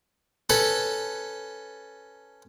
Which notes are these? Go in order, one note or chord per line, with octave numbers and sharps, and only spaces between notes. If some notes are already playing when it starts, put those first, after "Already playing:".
C#4 A4 B4